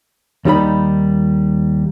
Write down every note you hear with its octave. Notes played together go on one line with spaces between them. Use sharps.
D#2 G3 D#4 B5